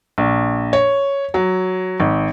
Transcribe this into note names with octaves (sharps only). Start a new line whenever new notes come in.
A#1
C#5
F#3
G#1